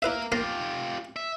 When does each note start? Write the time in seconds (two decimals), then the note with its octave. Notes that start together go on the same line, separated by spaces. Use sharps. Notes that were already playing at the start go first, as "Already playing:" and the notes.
0.02 E4 A#4 B4 E5 F5
0.32 A#3 F4 G4 F5 A#5
1.16 E5